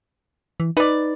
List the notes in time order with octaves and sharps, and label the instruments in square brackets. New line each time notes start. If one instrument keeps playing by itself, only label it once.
[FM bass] E3
[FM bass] D#4 [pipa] B4 D5